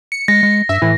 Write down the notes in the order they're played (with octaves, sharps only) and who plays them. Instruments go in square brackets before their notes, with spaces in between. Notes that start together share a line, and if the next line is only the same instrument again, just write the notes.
[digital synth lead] C#7
[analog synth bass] G#3 [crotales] A#6
[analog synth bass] G#3
[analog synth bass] G2 [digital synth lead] E5
[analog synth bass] A2 [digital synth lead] E3